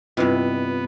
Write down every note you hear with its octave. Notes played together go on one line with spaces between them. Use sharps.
G2 C3 B3 E4 F4 B4 D#5